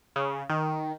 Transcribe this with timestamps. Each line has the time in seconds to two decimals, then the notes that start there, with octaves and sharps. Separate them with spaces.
0.16 C#3
0.50 D#3